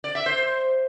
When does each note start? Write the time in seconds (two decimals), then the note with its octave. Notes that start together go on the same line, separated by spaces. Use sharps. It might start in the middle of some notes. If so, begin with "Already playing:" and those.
0.04 D5
0.15 E5
0.26 C5